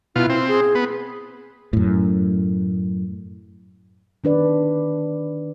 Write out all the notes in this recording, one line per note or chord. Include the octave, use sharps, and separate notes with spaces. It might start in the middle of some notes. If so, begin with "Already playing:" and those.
B2 E4 F4
C4
G#4
B3
F#2 A2
D#3 D4 B4 D5